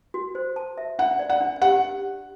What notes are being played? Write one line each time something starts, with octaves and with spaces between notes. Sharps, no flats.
F#4
C5
A5
E5
D4 F#5
D5
F#5
D4
G4 F#5